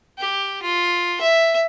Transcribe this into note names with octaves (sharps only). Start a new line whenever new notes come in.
G4
F4
E5